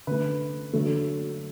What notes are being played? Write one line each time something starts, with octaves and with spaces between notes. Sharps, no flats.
D3 A3 B4
D3 F#3 A3 A4